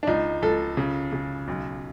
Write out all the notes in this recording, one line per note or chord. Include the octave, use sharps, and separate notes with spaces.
D4
C#2 D#4
C#2 A4
C#3
C#3
B1